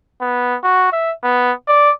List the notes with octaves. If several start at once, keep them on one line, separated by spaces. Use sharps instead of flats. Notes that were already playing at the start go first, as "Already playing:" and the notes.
B3
F#4
E5
B3
D5